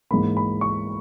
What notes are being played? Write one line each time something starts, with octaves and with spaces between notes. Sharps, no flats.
G#2 E3 A#3 B5
B5
C#6